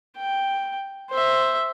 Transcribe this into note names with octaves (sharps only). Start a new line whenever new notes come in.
G5
C5 E5